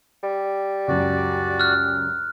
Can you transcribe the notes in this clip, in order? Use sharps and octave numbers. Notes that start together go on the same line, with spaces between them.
G3
C#2 F#2 F#4 D5
F6 F#6